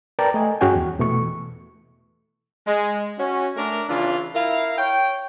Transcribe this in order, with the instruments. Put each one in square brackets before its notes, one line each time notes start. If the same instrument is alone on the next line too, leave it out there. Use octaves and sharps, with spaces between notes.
[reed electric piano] A#4 B4 D5 G5 A5 A#5
A3 D#5 G#5
G2 C#4 F#4 G#4 G5 G#5
E2
B2 E3 A3 C#6
[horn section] G#3
C#4 F#4
A3 D4 A#4
C#3 E3 D4 F4
E4 A#4 E5 F5
C#5 G5